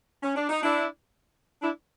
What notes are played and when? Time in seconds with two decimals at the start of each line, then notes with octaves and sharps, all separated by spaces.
0.23 C#4
0.36 D4
0.50 D#4
0.63 D4 E4
1.62 D4 E4